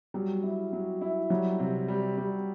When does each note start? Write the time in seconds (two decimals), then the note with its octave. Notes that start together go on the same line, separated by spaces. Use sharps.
0.14 F#3 G3
0.43 E4
0.73 F#3
1.01 E4
1.30 F#3 G3
1.59 C3
1.88 G3
2.18 G3